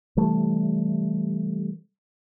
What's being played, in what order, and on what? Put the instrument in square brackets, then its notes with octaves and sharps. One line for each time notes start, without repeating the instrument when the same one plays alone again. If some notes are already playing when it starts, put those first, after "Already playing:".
[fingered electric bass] C3 E3 G3 A3